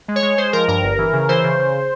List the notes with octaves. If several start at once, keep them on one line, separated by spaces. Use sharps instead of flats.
G#3
C#5
G#3
G#3 C5
F3 A#4
G2 A#4
G1
E3
C#3
E3 C5
C#3
C#3